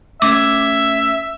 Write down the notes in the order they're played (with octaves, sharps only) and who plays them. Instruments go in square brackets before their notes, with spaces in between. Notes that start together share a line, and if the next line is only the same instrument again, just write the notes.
[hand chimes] A3 C#4 G#6 [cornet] E5 [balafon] D6